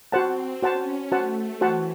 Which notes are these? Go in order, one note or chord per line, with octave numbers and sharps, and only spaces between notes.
C4 F#4 C5 F#5 A5
C#4 F#4 C5 F#5 A5
A3 F#4 C5 F#5 A5
E3 F#4 C5 F#5 A5